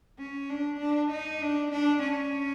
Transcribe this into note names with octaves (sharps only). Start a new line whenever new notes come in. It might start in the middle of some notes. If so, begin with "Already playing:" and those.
C#4
D4
D4
D#4
D4
D4
C#4